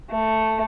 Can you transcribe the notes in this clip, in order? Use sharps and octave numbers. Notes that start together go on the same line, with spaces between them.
A3